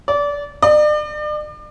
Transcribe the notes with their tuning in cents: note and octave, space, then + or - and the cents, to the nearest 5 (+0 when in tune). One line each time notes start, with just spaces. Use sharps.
D5 -25
D5 +40